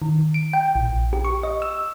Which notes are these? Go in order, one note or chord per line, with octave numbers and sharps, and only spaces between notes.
D#3
D7
G5
A#1
G4
C#6
D#5
E6